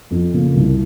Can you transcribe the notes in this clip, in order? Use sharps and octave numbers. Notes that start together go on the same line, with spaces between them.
F2
C#3 F3 A#3
C2